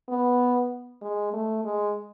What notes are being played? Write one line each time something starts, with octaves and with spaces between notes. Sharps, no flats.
B3
G#3
A3
G#3